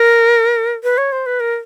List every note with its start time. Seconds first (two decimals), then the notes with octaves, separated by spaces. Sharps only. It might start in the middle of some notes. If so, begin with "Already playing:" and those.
Already playing: A#4
0.84 B4
0.98 C#5
1.12 C5
1.26 B4
1.40 A#4